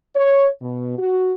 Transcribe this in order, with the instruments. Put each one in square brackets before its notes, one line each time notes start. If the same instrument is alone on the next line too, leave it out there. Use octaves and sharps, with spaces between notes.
[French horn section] C#5
B2
F#4